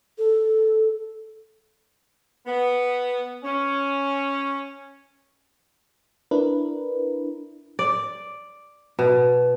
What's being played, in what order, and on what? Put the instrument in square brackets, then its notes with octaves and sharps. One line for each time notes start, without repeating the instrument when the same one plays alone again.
[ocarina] A4
[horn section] B3
C#4
[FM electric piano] D4 E4 A#4 B4
[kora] D5
B2